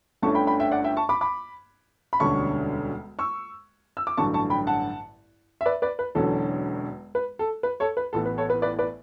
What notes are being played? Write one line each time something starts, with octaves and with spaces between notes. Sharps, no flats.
G1 G2 D3 A3 C#4 A5 C#6
G5 B5
G5 B5
E5 G5
D5 F#5
E5 G5
A5 C#6
B5 D6
B5 D6
B5
E1 D2 D3 G3 C#4 A5 C#6
C#6 E6
E6
D6
A1 G2 D3 F#3 A5 C#6
A5 C#6
G5 B5
F#5 A5
E5
B4 D5
B4 D5
B4
E1 E2 D3 F#3 C#4 A4
B4
A4
B4
A4 C#5
B4
A1 A2 E3 B3 A4
B4
A4 C#5
B4
B4 D5
B4 D5